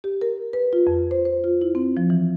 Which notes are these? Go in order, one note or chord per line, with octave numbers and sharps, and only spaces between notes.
G4
A#4
B4
F4
F2
C5
C5
F4
E4
C4
F3
E3